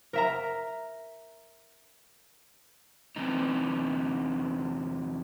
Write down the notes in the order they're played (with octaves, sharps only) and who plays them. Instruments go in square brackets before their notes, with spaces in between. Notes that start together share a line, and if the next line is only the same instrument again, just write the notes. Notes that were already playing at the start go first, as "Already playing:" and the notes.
[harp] A#4 E5 A#5
[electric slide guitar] E2 C3 D#4